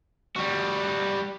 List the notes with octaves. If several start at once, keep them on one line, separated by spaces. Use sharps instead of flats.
G3 F#4